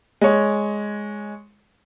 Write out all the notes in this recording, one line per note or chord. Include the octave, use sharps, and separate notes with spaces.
G#3 C#5